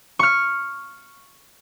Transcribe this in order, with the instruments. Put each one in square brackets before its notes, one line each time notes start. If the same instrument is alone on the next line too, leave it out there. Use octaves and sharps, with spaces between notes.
[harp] C#6 F6